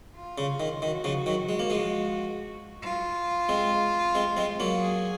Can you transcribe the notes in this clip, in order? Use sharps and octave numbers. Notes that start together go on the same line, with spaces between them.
F4
C#3
D#3
D#3 F#4
C#3 F3
D#3 F#3
G#3
A#3
F3 G#3
F4
G#3 C4
G#3 C4
G#3 C4
F#3 A#3
G#4